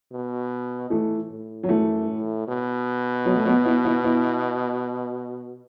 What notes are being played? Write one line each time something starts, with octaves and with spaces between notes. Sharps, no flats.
B2
A2 E3 A3
A2
F#3
F#2 E3 A3
A2
B2
F#3 B3
A3
F#3 B3
B3 E4
B3 E4
B3 E4